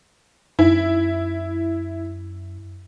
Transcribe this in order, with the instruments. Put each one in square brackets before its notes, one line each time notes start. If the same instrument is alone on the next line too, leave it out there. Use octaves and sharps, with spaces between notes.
[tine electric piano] F#2 [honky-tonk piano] E4